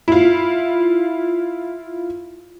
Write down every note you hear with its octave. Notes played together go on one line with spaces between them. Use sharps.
E4 F4